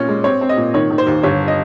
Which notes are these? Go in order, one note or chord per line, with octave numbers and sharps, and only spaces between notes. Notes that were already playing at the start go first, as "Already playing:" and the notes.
Already playing: A#2 C4 C#4
G#3
C4 C#5
C4
D#5
A#2
D#3 C#5
D#3
C5
D#2
G1 C#5
D#5